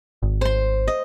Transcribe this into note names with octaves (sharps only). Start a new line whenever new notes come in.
G#1
C5 C6
D#5